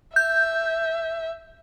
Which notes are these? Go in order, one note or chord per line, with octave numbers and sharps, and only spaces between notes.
E5 G6